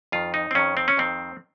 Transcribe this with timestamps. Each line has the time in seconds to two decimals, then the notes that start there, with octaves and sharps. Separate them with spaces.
0.12 F2 D#3 F4
0.34 D#4
0.51 C4
0.55 F2 D#3 C#4
0.77 C4
0.88 C#4
0.97 F2 D#3 C4